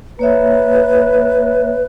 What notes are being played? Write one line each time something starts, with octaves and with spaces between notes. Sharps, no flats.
A#3 B4 C#5 E5